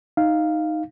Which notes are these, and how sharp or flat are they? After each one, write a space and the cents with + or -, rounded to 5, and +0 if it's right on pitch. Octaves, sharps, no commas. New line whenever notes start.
D#4 +0 F5 +0